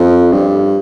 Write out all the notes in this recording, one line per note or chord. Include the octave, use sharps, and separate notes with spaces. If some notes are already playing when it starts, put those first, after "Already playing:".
Already playing: F2
G2